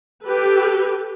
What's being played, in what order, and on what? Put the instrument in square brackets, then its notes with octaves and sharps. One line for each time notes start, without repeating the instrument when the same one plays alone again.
[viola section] G4 A4 B4